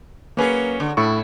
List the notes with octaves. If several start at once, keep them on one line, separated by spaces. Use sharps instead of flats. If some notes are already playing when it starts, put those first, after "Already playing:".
F#3 A#3 C#4 G#4 B4
D3
A2 E4 A4 C#6